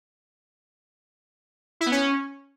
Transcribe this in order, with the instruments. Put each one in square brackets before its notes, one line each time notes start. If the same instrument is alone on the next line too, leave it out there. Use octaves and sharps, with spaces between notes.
[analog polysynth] E4
B3
C#4